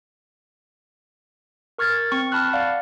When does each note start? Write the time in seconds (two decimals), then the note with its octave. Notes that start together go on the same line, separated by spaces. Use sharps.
1.78 A#4 C#6 F6 G#6 A6
2.12 C4 C#6
2.32 A5 B5 C#6 F6 F#6
2.53 D5 F5 F#5